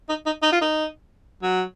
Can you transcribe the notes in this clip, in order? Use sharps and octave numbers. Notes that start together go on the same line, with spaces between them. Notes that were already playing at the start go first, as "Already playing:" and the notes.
D#4
D#4
D#4
F4
D#4
F#3